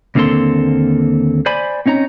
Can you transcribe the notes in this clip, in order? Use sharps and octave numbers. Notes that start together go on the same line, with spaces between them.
D#2 D3 A#3 C4 A4 C6
C5 D5 G#5 B5
C4 C#4 D#4 C#5 A#5